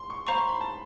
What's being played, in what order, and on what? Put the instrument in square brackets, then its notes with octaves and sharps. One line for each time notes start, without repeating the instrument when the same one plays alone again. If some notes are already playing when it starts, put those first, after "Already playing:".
Already playing: [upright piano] C6
C#6
[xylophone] C5 F5 A#5 C#6 [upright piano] B5
[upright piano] C6
B5
A5